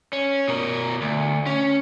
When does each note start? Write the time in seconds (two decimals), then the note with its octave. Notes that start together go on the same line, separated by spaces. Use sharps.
0.13 C#4
0.48 B2 A#4
1.02 D2
1.46 C#4